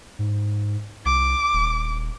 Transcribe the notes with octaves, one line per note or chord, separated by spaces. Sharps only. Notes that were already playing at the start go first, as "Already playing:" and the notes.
G#2
C2 D6
D#1